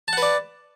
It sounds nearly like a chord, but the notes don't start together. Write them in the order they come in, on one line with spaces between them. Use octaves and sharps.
A5 F#5 B4 D5